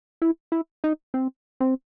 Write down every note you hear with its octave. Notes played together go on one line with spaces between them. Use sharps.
E4
E4
D#4
C4
C4